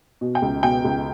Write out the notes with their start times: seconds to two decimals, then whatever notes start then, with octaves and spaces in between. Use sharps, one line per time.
0.21 B2
0.35 G5
0.42 C#2
0.63 B2 G5
0.85 C#2